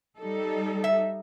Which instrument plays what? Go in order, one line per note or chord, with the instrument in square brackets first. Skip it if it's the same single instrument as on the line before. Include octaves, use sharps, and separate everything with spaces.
[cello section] G3 D#4 A4
[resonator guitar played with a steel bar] E5